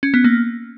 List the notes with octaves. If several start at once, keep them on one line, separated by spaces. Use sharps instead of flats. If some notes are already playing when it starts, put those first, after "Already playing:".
C#4
B3
A#3